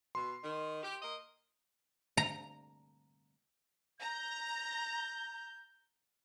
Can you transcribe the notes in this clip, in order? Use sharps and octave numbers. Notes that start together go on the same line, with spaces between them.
B2 C6
D#3
G4
A#3 D#5
A#5
A#5 G6